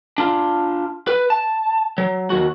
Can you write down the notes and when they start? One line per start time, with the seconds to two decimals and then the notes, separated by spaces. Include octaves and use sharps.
0.18 D4 F4
1.07 B4
1.30 A5
1.98 F#3
2.30 D#2 F#4